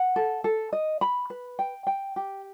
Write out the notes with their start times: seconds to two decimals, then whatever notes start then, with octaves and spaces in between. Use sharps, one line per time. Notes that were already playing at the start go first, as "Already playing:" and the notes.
Already playing: F#5
0.16 A4
0.44 A4
0.73 D#5
1.01 B5
1.30 B4
1.59 G5
1.87 G5
2.16 G4